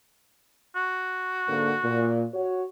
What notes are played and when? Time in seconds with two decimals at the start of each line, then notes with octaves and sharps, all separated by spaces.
0.76 F#4
1.47 G#2 D3 A#3
1.84 A#2
2.33 F#4 C#5